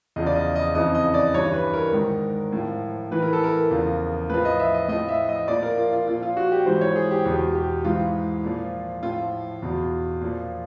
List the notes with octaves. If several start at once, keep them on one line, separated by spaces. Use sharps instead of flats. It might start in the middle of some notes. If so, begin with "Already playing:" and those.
E2 C#3 F3 D#5
D5
D#5
D#5
F2 C#3 E3 D#5
D#5
D5
G2 E3 C#5
B4
A#4
G#2 D#3
A2 F3
A2 E3 B4
A#4
A4
A#4
E2 C#3 F3
A2 F3 B4
D#5
E5
D#5
A2 F3 D#5
E5
D#5
A#2 F3 D5
A#4
F4
F4
A#2 F3 F4
F4
F#4
G4
G#2 E3 C5
C#5
G#4
G4
E2 B2 G4
G4
G#2 E3 F4
A#2 F3
A2 F3 F4
E2 B2
A#2 F3